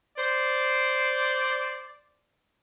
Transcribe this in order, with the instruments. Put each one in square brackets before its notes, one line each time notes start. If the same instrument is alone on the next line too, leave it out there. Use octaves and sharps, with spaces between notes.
[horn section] C5 D5